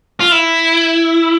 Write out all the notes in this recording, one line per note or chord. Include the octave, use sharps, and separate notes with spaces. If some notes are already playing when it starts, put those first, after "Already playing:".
F4
E4